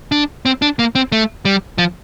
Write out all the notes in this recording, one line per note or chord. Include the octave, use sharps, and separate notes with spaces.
D4
C4
D4
A#3
C4
A3
G3
F3